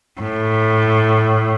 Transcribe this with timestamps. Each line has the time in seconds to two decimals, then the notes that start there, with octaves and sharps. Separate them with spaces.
0.21 A2